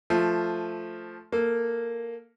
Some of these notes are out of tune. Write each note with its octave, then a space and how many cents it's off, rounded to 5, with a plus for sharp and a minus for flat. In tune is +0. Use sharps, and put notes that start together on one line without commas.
F3 +0 A3 +0
A#3 +0 A4 +10